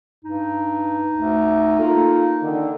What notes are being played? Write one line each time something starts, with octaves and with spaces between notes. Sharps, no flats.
G2 D#4
D2
A#3 F4 A4
D3 D#3